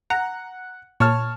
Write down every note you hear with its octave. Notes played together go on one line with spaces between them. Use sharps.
F#5 A#5
A#2 C#5 A5 F6